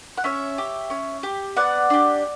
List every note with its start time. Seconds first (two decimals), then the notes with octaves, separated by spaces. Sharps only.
0.17 F#5
0.24 C#4 C#5 E5
0.58 G4
0.90 C#4
1.23 G4
1.56 B3 D5 F#5
1.90 D4 G4